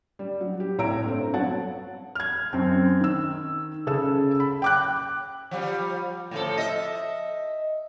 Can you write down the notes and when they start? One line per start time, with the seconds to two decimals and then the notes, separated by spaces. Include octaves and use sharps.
0.19 G3
0.41 F#3
0.60 G4
0.78 C2 A2 C#5 A#5 E6 D7
1.03 G2 A3 C4
1.34 F#3 B3 C#5 F#5 A5 A6
2.15 F6 G#6
2.53 F#2 C4
3.00 D#3 E6
3.87 C#3 G#4 A4 E6
4.40 B5
4.62 G5 D6 F#6
5.51 F3 G3
6.31 A2 F3 A4
6.57 D#5 E5